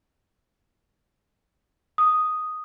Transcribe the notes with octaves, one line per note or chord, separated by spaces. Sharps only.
D#6